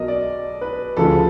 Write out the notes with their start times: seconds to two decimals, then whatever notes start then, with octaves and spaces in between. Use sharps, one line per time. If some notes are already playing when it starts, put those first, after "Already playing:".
Already playing: B1 B2 F#3 A#4 D#5
0.08 D5
0.61 B4
0.97 D2 C#3 F3 A4